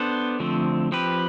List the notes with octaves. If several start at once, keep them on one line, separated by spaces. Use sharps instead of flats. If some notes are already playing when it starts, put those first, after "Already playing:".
Already playing: B3 D4 A4 C5
D3 F3 A3 C4
F3 C4 G4 B4